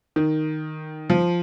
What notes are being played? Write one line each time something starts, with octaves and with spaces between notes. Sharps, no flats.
D#3
F3